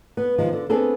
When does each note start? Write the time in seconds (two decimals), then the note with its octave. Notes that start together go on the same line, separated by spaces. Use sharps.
0.17 B3
0.38 D#3 F3 G#3
0.53 D3
0.70 B3 C4 D4 G#4 A4